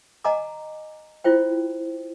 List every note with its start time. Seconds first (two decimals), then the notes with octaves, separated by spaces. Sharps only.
0.24 D#5 F#5 G#5 A#5 D6
1.24 E4 F4 C5 G5